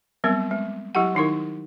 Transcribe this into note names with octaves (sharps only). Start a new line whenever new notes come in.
F#3 G3 B3 C4 A#4
G#3
F#3 E4 G4 F#5
D#3 D#4 E4 A#4